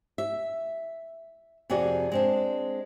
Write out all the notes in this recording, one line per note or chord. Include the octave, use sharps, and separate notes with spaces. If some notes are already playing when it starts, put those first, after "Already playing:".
E5
F2 C3 F#4 G#4 D5
G#3 C4 D4